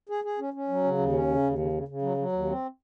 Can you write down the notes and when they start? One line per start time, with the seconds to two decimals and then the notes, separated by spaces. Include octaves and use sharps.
0.09 G#4
0.24 G#4
0.39 C#4
0.54 C#4
0.68 F#3
0.84 C#3
0.98 D#2
1.12 C#4
1.28 C#3
1.43 D#2
1.58 C#3
1.72 C#3
1.88 C#3
2.02 F#3
2.17 F#3
2.32 D#2
2.48 C4